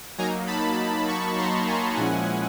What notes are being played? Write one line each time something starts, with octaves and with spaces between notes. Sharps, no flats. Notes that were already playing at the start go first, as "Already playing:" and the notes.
F#3 A#3 D#4 G#5 A#5
A5 B5
B5 C#6
A#5 C6
G#5 A#5
A#2 F3 G#3 C#4 E4 F#5 G#5